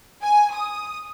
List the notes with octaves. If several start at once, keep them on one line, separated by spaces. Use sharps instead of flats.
G#5
D#6